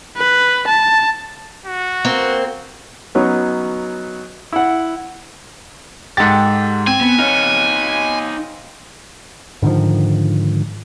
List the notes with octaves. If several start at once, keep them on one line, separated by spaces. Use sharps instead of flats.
B4
A5
F#4
A#3 C4
F#3 B3 C#4 D#4
E4 F#5
G#2 G4 A4 F#5 A6
C4 G#5
B3
D#4 B4 C#5 F5
G#2 D3 D#3 F3